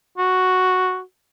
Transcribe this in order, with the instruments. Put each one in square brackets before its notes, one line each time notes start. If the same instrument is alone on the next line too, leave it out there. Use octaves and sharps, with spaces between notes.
[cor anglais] F#4